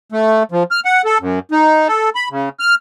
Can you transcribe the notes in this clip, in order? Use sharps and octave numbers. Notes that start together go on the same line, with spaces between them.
A3
F3
F6
F#5
A4
F#2
D#4
A4
B5
C#3
F6